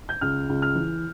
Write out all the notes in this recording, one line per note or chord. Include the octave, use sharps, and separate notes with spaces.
G6
C#2 F6
C#2
F6
E3